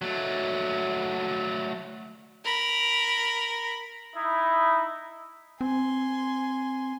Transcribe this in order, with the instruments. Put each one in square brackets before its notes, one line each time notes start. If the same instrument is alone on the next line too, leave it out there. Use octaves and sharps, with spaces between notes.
[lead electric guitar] F#3 A3
[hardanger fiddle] A#4 B5
[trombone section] D#4 E4
[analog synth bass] C4 [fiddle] G#5 C6